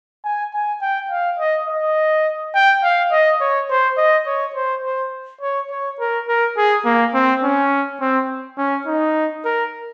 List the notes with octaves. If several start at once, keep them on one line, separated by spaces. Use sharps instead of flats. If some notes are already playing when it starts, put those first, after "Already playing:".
G#5
G#5
G5
F5
D#5
D#5
G5
F5
D#5
C#5
C5
D#5
C#5
C5
C5
C#5
C#5
A#4
A#4
G#4
A#3
C4
C#4
C4
C#4
D#4
A#4